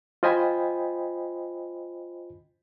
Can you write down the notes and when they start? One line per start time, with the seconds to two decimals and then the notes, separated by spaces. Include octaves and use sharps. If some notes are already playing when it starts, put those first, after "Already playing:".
0.23 F4 C5 D#5 G5 G#5 B5